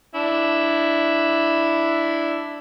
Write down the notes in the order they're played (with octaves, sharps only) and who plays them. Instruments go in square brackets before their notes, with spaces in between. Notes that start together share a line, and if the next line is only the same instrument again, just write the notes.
[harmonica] D4 E4